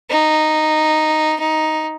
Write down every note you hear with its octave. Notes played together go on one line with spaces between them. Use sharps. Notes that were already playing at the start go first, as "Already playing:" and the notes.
D#4
D#4